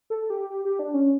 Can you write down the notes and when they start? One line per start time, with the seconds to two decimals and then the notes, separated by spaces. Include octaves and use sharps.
0.10 A4
0.30 G4
0.50 G4
0.65 G4
0.79 D4
0.94 C#4